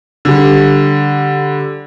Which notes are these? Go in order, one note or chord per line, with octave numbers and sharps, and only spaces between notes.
D3 G3